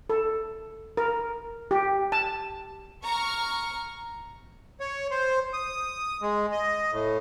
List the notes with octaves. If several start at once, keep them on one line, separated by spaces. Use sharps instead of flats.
A4
A#4
G4
A5
A#5 C#6 F6
C#5
C5
D#6
G#3
D#5
A2